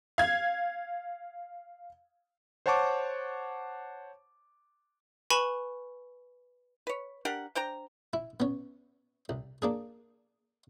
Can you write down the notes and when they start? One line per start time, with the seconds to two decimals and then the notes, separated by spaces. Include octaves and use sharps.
0.18 F5 G#6
2.66 C5 C#5 F#5 A5 C#6 D6
5.30 B4 G#5 B5 C#6 E7
6.87 B4 C#5
7.25 D4 G4 A#4 F#5
7.55 D4 C5 G5 A#5
8.13 E4
8.40 B3 C#4
9.29 C2
9.62 A#3 D4 G#4